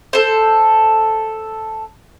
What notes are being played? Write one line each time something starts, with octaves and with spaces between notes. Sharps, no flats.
A4 C5